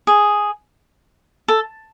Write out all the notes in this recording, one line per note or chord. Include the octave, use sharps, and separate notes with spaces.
G#4
A4